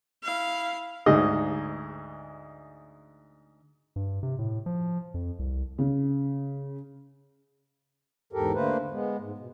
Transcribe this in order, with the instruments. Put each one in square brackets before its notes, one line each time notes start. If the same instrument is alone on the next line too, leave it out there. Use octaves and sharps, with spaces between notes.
[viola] E4 F5
[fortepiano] D2 G#2 G#4 D#5
[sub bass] G2
C3
A2
F3
F2
C2
[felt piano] C#3
[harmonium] E2 G#2 G4 A4 A#4
D3 A3 A#3 B4 C5
G#3 B3
G#2
B2